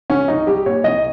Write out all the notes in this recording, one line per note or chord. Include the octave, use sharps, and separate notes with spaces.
C#2 C#4
C2 D#4
G3 G4
A#2 C#5
C2 D#5